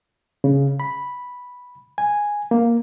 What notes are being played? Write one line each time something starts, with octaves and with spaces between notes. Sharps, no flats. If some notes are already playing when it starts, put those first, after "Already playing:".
C#3
B5
G#5
A#3